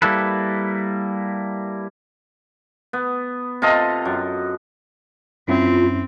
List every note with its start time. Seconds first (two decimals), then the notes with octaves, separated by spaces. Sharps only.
0.02 G3 A#3 E4 A4 B4
2.93 B3
3.62 C3 F4 A4 D#5
4.05 F#2
5.48 F#2 C4 C#4 E4 F4